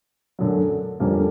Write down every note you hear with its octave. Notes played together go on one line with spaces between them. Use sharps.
F#2 D3 F#3
F2 D3 G3 A#3 C#4